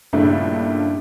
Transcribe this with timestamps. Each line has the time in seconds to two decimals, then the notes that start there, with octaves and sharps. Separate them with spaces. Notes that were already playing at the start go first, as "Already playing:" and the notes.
0.13 G2 A#2 C#3 A3 D4 E4